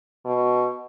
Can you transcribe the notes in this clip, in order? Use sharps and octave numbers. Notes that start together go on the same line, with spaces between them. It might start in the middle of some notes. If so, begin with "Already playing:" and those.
B2